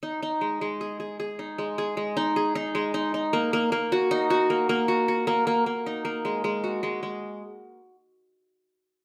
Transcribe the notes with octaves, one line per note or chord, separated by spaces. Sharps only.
D#4
D#4
G#3
G#3
G#4
G#4
G#4
D#4
G#3
G#4
G#3
D#4
G#4
D#4
G#3
D#4
D#4
A#3
A#3
A#3
F#4
D#4
F#4
A#3
A#3
F#4
F#4
A#3
A#3
A#3
D#4
A#3
G#3
G#3
F#4
G#3
G#3